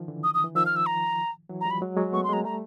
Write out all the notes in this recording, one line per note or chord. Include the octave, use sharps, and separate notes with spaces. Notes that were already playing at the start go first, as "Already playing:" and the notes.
Already playing: D#3 F3
D3 E3
D#6
D#6
E3
D#3 F3 E6
F6
E6
A#5
E3 F#3
A#5
F3 G3
B5
F#3 G#3
F#3 G#3
A3 B3 C#6
C6
G#3 A#3 A#5
G3 A3 A#5